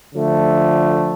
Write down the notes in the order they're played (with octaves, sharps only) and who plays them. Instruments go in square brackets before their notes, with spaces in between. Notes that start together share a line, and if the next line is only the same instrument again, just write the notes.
[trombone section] D3 F3 A3